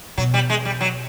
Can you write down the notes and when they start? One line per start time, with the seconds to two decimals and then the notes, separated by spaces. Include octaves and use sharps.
0.18 B2 F#3
0.34 G3
0.50 G#3
0.65 G3
0.81 F#3